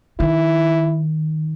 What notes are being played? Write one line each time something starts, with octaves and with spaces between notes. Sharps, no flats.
D#3 E4